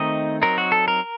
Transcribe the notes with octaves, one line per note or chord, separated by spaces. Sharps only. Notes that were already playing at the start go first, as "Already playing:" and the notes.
Already playing: D#3 A3 C4 D#4 D#5
F#3 C4 D#4 A#4
F#4
A4
A#4